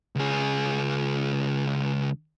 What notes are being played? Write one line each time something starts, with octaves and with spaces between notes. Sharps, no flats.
C#2 G#4